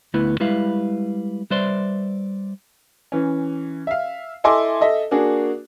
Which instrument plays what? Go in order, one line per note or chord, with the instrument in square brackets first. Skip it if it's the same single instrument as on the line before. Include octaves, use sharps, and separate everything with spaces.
[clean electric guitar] D2 A3 B3 E4 B4
G3 G#3 E4 B4 E5 F5
G3 B4 C5 D5 E5 C6
[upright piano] E3 C#4
E5 F5
E4 A4 D#5 G#5 C6 D6
A4 D#5 E5
A#3 D4 F#4 G#4